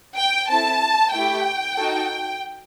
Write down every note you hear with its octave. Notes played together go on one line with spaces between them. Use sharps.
G5
C4 E4 A4 A5
A3 E4 G4 G5
D#4 F#4 A4